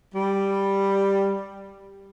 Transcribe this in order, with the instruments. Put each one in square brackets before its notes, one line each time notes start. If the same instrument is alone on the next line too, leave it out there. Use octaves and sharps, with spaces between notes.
[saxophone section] G3